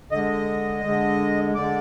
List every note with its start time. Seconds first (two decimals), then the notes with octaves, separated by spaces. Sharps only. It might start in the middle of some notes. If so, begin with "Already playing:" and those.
0.12 D3 G#3 D#5
0.84 D3 G#3
1.55 D3 G#3 D5